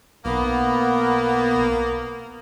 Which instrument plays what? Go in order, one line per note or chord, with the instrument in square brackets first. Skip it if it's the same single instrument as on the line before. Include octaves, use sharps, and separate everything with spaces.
[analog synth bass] B1 [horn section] A#3 [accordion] B3